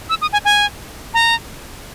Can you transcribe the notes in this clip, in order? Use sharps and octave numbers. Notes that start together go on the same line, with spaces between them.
E6
D#6
G#5
G#5
A#5